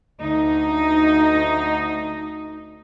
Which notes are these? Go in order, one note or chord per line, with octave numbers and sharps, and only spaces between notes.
D2 D#4